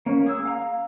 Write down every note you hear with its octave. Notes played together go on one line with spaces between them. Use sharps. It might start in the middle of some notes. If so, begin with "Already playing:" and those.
A#3 C#4
G#4 E6
F5 A#5